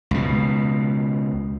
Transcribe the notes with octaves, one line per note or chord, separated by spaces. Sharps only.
C#2 B2